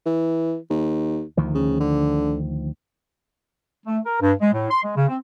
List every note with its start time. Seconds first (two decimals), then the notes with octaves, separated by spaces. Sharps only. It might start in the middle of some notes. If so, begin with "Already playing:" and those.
0.06 E3
0.70 D#2
1.37 D2 D#3 F3
1.55 C#3
1.80 D3
3.86 A3
4.05 A#4
4.22 G2
4.40 G#3
4.53 A2
4.71 C6
4.84 G#3
4.97 C#3
5.09 C4